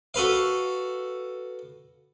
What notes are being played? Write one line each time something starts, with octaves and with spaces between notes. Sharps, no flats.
F#4 A4 B4 F5